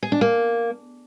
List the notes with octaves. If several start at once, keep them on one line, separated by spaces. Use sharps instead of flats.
G#4
D4
A#3